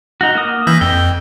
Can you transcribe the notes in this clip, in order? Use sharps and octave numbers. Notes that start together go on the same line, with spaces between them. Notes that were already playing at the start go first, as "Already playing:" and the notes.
D#4 F#4
A#3 D#6
E3 E4 G6 A#6
F2 G5